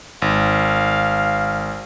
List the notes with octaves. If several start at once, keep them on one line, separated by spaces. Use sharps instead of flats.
G#1 F5